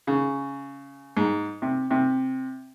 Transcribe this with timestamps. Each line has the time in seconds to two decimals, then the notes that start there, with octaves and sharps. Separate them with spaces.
0.07 C#3
1.17 G#2
1.62 C3
1.91 C3